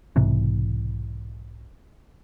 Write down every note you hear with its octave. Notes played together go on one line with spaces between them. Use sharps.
B1 G#2 C3 E3